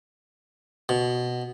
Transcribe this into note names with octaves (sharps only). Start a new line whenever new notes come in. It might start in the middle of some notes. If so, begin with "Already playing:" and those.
B2